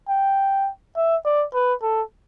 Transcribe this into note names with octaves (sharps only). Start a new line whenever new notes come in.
G5
E5
D5
B4
A4